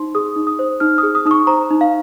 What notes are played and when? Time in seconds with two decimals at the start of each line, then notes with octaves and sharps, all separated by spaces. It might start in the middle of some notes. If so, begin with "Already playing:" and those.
Already playing: D#4 C5 C6
0.15 G#4 D#6
0.36 D#4
0.47 D#6
0.59 C5
0.80 D#4 F6
0.98 D#6
1.03 G#4
1.15 D#6
1.25 D#4 D#6
1.31 C#6
1.47 C5 A#5
1.71 D#4
1.81 F5